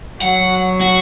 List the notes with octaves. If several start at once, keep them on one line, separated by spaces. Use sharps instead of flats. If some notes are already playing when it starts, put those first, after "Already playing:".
F#3 F#5
F#4